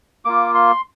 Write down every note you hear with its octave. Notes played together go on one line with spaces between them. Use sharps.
A#3 F4 D6
C6